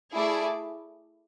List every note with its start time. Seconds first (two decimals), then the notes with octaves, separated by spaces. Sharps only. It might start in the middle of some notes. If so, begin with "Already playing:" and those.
0.13 A3 E4 G#4 D5